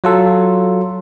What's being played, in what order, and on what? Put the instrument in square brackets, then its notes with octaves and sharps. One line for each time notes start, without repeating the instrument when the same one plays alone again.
[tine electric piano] F#3 F4 A4